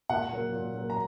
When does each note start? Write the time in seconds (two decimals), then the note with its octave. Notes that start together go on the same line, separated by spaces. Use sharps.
0.09 A#2 F#5
0.32 F#3 A#3
0.53 A#2
0.74 F#3 A#3
0.90 A#5